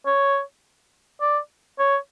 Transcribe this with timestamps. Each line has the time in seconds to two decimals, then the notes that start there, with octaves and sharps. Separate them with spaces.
0.06 C#5
1.21 D5
1.79 C#5